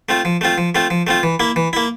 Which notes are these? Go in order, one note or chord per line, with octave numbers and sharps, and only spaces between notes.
A3 C4 F4
F3
A3 C4 F4
F3
A3 C4 F4
F3
A3 C4 F4
E3
A#3 E4
E3
A#3 E4